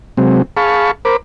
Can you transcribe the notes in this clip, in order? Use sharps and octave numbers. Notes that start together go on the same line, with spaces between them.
C3 F#3 G#3 C4
G#4 F5 A5 B5 C#6
A#4 C5 B5 D6